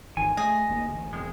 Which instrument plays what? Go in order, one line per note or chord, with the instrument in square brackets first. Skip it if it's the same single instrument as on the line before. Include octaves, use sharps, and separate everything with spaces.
[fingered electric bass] G#1 E2 D#3 [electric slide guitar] G#5
[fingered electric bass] A3 [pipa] G#4 [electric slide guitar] D#5
[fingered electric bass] F1 D#2 A#3
A1 D2
[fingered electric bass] E1 [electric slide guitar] F2 G#3